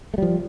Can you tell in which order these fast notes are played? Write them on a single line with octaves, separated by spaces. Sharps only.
A3 G3 F3